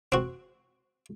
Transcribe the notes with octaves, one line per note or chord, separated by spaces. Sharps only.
C4 F#4